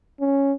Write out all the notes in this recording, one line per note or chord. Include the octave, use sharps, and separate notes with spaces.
C#4